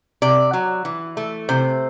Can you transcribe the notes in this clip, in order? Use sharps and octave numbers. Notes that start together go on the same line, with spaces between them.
C3 D5
F#3
E3
A3
C3 C5